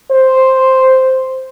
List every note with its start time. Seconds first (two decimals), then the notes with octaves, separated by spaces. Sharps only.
0.11 C5